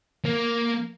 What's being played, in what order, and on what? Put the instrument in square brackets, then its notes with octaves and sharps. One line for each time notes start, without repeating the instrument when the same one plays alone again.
[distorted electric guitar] A#3